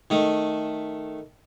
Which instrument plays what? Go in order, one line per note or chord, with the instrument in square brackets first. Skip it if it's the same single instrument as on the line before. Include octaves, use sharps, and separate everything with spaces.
[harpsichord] D#3 A3